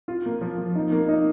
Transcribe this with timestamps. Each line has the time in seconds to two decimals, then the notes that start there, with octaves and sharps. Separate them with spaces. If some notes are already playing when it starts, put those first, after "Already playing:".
0.08 F4
0.26 A#3
0.41 F3
0.58 F3
0.75 D#4
0.92 A#3
1.08 D#4